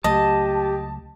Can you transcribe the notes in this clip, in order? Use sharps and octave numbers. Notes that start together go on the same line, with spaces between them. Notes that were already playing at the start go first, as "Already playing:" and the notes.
C#2 F#3 A3 G4 D#5 A5